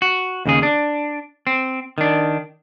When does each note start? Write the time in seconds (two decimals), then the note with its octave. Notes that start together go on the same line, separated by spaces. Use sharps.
0.02 F#4
0.46 D#2 C#3 G#4
0.63 D4
1.47 C4
1.98 D#3 D4